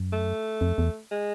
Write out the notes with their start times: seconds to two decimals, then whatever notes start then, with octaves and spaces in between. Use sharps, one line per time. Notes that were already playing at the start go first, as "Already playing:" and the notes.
Already playing: F#2
0.12 A3
0.61 F2
0.78 E2
1.11 G#3